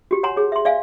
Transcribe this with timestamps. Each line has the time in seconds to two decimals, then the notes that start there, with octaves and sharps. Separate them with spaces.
0.11 F#4 G4
0.23 C#5 F#5 G#5 A#5 C6
0.36 G#4 C#5
0.52 E5 C6
0.65 D5 E5 F5 G#5